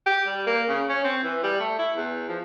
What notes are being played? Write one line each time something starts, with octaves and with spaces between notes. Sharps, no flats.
G4
G3
A#3
C#3
C#4
C4
E3
G3
A3
E4
E2
F3